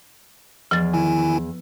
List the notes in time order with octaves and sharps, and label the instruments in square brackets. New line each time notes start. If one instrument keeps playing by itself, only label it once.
[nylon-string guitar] E2 [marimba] F3 A6
[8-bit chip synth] D#3 E4 G#5